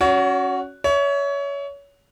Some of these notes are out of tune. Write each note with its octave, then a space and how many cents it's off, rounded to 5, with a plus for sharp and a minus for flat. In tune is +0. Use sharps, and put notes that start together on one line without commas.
C#4 +0 F#4 +0 C#5 +35
C#5 +25 E5 -15